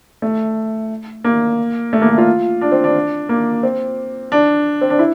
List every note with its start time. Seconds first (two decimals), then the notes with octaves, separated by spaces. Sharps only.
0.22 A3
1.24 A#3
1.93 A3
2.02 A#3
2.09 A3
2.18 F4
2.61 D4
2.72 C4
2.84 D4
3.29 A#3
3.63 C4
4.32 D4
4.81 C4
4.90 D4
4.99 E4